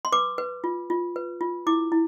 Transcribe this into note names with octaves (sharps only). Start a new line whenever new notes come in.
C6
B4 D6
B4
F4
F4
B4
F4
E4 D6
E4